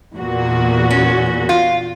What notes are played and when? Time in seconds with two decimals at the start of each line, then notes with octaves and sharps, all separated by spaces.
0.13 E2 A#2 F#4
0.90 C#4
1.49 F4